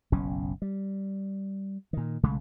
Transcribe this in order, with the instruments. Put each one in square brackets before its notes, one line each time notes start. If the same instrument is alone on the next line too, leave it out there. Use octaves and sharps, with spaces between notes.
[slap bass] F#1 B1 C#4
G3
A#2 D#3
B1 C#3 G#3 A3